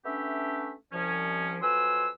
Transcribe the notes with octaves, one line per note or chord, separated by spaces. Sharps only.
A3 B3 C#4 D4 G4 E5
C2 F3 C#4
F2 F#3 B4 G#5 C6 E6